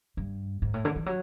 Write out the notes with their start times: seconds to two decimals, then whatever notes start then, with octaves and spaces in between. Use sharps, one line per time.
0.17 G2
0.62 G#2
0.74 A2
0.85 D3
0.96 E3
1.06 F#3